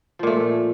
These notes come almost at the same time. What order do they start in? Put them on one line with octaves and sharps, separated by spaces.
F3 A#2 A3